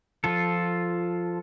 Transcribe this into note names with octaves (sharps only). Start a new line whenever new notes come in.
F3 F4 A4